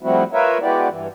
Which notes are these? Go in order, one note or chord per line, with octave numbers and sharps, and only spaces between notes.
F3 G3 A3 C4 E4 F#4
F4 A#4 B4 C#5 E5
G#3 B3 E4 F#4 G4 D5
G2 E3